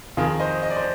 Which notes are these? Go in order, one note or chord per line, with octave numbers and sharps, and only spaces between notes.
F2 D#3 F4 G#4
C5 D#5
D#5
D5
C5